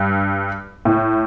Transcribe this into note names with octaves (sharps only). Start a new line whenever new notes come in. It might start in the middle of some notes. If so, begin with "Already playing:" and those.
Already playing: G2
A2